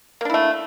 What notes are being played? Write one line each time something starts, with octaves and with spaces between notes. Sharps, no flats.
A3 A#3 D4 E4